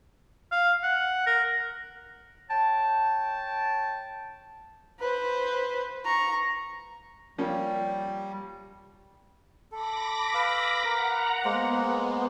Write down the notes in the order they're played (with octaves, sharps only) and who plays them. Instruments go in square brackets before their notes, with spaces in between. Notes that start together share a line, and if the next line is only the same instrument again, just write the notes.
[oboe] F5
F#5
A#4
[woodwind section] C#5 G5 A5
[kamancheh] B4 C5
A#5 C#6
[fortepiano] F3 A#3 C#4 [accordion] G3
[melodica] A4 [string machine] B5 D6 A#6
[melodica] B4 F5 E6
[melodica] A#4 [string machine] F#5 A#5
[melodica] G#3 A#3 C5 [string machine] B3